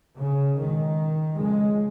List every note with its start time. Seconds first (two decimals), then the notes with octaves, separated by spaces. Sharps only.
0.17 C#3
0.57 C#2 B2 D#3
1.36 F2 C#3 G#3